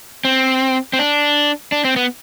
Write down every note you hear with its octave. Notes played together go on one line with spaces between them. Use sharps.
C4
C4
D4
D4
C4
B3